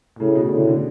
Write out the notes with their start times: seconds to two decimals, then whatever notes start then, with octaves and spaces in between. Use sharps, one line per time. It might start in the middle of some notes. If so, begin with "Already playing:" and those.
0.19 A2 C#3
0.35 B2
0.51 A2 D3
0.67 D3